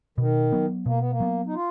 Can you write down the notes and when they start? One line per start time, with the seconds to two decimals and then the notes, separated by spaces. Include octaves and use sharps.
0.18 B2 D#3
0.53 F#3 B3
0.86 B2 A#3
0.99 B3
1.11 A#3
1.20 F#3 B3
1.47 D#4
1.54 F4